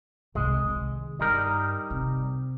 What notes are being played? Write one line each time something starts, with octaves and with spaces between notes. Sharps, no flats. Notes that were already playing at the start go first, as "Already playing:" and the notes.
C2 C3 G#3
C3 D#3
G2 G3 D#4 A#4
C3